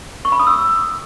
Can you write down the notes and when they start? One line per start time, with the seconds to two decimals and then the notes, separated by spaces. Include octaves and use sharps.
0.25 C#6
0.32 B5
0.39 D#6
0.47 E6